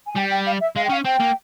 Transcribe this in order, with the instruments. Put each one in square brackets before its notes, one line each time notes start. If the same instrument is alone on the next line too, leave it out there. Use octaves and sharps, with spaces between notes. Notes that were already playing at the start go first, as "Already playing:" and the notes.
[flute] G#5
[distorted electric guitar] G3 [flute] G5
[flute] G5
F5
E5
[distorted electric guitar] G#3 [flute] F5
[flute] G5
[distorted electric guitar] C#4 [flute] F5
[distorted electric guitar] C4 [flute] G5
[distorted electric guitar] A#3